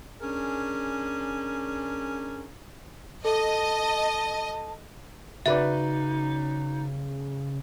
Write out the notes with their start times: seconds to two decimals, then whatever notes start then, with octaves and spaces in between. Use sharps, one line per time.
0.20 C#4 D4 G#4 A#4
3.25 A4 D#5 A5
5.46 C#3 D#4 F#4 B4 D5 E5